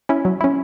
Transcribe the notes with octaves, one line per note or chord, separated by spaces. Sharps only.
C#4 E4
F#3
C#4 E4